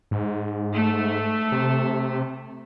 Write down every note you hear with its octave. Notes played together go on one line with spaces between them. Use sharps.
G#2
A3
C3